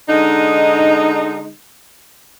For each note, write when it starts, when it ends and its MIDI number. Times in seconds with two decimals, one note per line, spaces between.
0.09 1.52 50
0.09 1.52 56
0.09 1.52 63